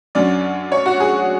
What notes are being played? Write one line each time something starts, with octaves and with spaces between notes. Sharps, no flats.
F#2 D3 F#3 C#4 D5
C#5
F#4
G#4